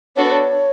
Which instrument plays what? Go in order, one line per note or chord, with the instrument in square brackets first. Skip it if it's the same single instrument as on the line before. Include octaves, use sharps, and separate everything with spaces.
[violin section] B3 D4 F#4 A4 [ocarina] C#5
[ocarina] B4
C#5